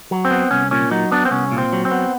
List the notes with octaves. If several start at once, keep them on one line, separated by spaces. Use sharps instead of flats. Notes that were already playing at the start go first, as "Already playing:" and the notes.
F#3
C4
B3
C2 C#4
A#2 C#4
F#3 D#4
B3 D4
C4
C2 C#4
A#2
C4
F#3
C4
B3